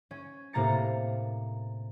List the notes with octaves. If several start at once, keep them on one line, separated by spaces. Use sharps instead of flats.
C#4
A2 C3 A#3 A#5 A6 C#7